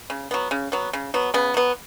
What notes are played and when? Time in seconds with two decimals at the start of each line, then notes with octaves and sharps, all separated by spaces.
0.10 C#3
0.31 F#3 B3
0.51 C#3
0.72 F#3 B3
0.93 C#3
1.14 F#3 B3
1.34 C#3 B3
1.54 F#3 B3